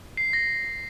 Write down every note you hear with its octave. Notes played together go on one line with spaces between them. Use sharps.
C7
A#6